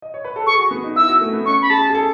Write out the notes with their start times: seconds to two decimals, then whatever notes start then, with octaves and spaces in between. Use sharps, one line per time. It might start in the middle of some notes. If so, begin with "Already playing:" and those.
0.02 D#5
0.14 C#5
0.24 B4
0.36 A4
0.46 G#4 C#6
0.59 F#4
0.71 B3
0.84 D#4
0.96 E4 E6
1.09 F#4
1.21 A3
1.33 B3
1.45 C#4 C#6
1.61 B5
1.70 G#4 A5
1.90 G#4
1.94 A4